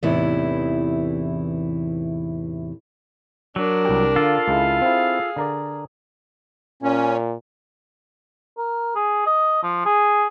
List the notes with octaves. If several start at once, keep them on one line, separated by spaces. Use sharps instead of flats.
E2 A2 C3 E3 D#4 E4
F#3 D4 A#4
C2 G4
D3 F4 A4 F5
C#2 G#3 E4
C4 E4 G#4
D3 A#4 D5
A#2 C#4
A#4
G#4
D#5
F3
G#4